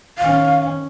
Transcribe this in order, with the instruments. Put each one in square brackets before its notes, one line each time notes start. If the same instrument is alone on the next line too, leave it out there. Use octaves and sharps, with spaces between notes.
[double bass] D#3 C#4 [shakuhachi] F5